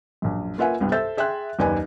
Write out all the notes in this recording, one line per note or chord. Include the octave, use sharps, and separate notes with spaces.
A#1 F#2
A#3 F4 B4 E5 F#5 G#5
C2 G2 B3
A4 C5 E5 E6 G6 A6
G#4 E5 G5 C6 F#6
F#1 D#2 B4 D5 G#5